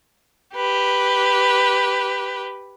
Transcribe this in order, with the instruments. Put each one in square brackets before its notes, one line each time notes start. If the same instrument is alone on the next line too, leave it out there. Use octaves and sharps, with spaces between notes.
[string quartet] G4 B4